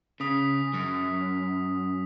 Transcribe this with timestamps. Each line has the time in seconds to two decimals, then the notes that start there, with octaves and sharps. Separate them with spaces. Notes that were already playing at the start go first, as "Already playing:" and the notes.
0.20 C#3 D#6 B6
0.74 F#2